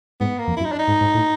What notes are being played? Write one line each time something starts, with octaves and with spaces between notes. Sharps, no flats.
G#2 B3
A#3
F2
E4
F#2
D#4
D4
D#4
G#2
G#2
A2